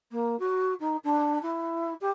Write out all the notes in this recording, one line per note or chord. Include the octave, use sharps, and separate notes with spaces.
A#3
F#4
D#4
D4
E4
G4